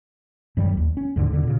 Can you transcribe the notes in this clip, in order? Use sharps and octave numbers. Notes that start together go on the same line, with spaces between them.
F#2 D#3 F#3 G3
E1 D#2
C#4
D#2 G#2 D3
E2 D3
A#2 C#3